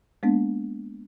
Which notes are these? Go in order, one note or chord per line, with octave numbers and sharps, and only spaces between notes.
G#3 A#3 B3 D4